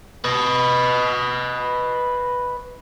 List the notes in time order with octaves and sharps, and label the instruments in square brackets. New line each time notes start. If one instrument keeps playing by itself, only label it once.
[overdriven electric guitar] B4 D#5